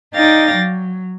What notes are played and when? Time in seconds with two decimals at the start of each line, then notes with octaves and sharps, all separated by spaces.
0.15 D#4 D5 F5 G5 A6 A#6
0.55 F#3